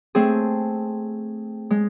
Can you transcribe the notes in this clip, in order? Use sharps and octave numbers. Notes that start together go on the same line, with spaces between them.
A3 C4 G#4
G#3